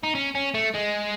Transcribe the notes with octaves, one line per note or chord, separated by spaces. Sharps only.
D#4
C#4
C#4
A3
G#3